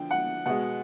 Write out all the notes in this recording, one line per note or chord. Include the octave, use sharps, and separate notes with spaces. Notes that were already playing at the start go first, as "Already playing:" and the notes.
Already playing: D3 F3 G5
F#5
B2 G#3 F#5